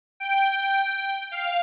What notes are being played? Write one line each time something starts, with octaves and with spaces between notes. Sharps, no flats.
G5
F5